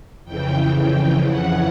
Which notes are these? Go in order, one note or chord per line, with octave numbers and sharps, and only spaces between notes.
F2 C#3 E3 G5
G5
F#5